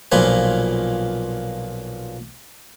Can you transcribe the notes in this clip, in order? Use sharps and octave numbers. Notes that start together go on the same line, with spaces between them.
B1 A#2 F3 A#3 B4 G#5